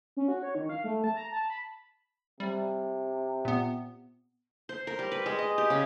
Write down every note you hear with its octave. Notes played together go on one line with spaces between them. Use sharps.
C#4
F#4
C#5
D#3
F5
A3
A5
A#5
A5
B5
C3 G3
A#2 B3
C5
A#4
G3
B4
G#3
D#5
G4
C#3